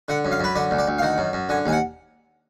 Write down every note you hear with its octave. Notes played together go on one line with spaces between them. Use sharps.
D3 F#5
F#2
F5
F#2 B4
D3 D5
D2
D5
D2
F5
D#3 F#5
F#2
F#2
D3 G#5
D#2 G#5
F#5